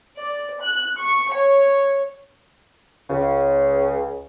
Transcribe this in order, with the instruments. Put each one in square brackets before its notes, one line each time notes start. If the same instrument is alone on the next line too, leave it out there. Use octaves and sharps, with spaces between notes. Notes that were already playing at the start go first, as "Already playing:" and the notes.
[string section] D5
F#6
C#6
C#5
[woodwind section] C#2 C#3